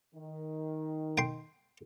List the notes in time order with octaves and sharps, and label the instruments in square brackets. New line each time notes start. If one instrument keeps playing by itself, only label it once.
[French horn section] D#3
[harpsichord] G5 C6